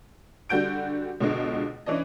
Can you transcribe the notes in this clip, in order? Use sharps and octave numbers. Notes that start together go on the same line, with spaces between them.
D3 G3 F#4 G6 D7
C#2 B2 D3 G#3
E3 C#4 D4 D#5